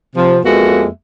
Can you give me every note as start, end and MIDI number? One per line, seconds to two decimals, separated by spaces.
0.16 0.38 48
0.16 0.38 53
0.44 0.86 41
0.44 0.86 56
0.44 0.86 58
0.44 0.86 59
0.44 0.86 66
0.44 0.86 76